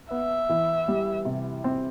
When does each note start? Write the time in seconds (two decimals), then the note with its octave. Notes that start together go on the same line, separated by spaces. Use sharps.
0.11 B3 E5
0.49 E3
0.88 G3
1.25 C3
1.64 C4